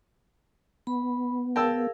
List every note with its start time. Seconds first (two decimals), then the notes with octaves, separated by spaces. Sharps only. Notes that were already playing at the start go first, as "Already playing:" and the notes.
0.87 B3 B5
1.56 G#4 A#4 F5 G5 A5 E6